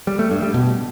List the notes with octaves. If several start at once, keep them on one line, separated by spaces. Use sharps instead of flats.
G3
A3
G2
G3
B2